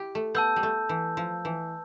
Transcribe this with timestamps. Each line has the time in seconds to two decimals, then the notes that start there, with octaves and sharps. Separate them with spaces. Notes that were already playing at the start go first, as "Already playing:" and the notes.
Already playing: E4 G4
0.15 A3
0.35 B3 A5 E6 G6
0.56 G3
0.63 A3
0.89 E3
1.17 F3
1.45 E3